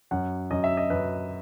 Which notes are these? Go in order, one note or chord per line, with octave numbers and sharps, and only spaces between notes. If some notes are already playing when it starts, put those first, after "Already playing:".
F#2 F#5
F#2 D#5
E5
D#5
F#2 B4